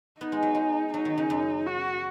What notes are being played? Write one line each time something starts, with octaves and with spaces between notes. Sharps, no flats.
B3 D#4
G#3
F#3
G#3
F#3 D#4
D#3
C#3
F#2
F#4